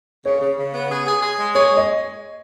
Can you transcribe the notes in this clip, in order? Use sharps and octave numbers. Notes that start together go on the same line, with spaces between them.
C#3 C#5
C#3
C#3
B3
G#4
G#4
G#4
G#3
G#4 C#5
G#3
D#5